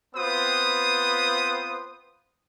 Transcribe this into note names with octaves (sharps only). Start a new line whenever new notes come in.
B3 C4 F4 B4 C5 D#6